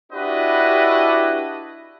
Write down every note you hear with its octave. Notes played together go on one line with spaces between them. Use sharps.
D4 E4 F#4 G4 B4 D#5